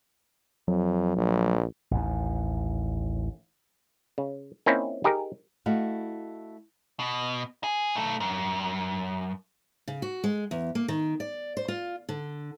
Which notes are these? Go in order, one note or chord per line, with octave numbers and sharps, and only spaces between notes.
F2 F#3
A#1
A1 D#2
C#3
A#3 C4 C#4 D#4 E4
D#4 G4 G#4 A#4
A3 E4 F#4 D#5 F5
B2
G#4
B1 A3
F#2
C#3
F#4
G#3
E2
A#3
D#3
D5
C5
F4
D3